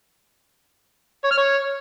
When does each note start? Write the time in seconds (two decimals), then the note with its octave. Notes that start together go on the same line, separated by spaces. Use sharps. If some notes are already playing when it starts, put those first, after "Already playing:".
1.24 C#5
1.31 F6
1.37 C#5